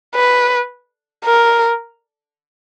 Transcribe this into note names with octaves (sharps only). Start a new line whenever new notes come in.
B4
A#4